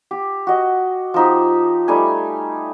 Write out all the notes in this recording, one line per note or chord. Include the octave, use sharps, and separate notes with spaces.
G4
F#4 D#5
F3 D#4 G4
G3 A3 D#4 G#5